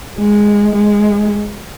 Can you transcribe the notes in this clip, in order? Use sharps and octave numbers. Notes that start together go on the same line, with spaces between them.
G#3
G#3